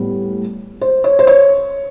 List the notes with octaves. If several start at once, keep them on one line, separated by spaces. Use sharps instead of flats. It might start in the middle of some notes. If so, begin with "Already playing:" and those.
Already playing: A2 G3 B3
C5
C#5
C5
C#5